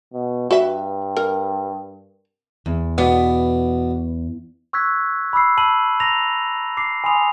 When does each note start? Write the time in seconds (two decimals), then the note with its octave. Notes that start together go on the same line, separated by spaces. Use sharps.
0.13 B2
0.51 G2 F#4 B4 E5
1.17 A#4
2.66 E2
2.98 B2 B3 D4
4.73 C#6 E6 F#6 G#6 B6
5.33 B5 D6 E6 C7
5.57 A5 B5 E6 C7 D#7 F#7
6.00 A#5 D6 A#6 F7
6.77 D6 C7
7.04 G#5 B5 C6 D#6 F7